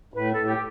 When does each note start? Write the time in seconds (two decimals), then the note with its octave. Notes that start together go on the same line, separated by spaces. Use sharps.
0.14 A2 B4
0.31 A4
0.37 A2
0.47 G4